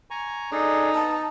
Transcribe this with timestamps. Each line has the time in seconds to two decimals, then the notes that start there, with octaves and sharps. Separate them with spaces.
0.10 G#5 A#5 C#6
0.52 D4 D#4 G#4 A4
0.95 B3 A5